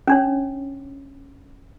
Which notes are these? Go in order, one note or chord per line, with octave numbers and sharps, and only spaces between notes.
C#4 D4 C#5